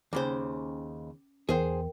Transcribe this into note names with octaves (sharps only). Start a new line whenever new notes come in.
D#2 C#3 C#4 C5 D6
E2 G#4 A#4 C5 G5